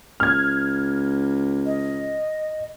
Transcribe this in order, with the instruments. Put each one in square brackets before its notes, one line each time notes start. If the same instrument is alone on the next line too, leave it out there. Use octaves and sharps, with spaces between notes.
[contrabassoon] C#2 [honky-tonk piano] F6 G#6
[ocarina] D#5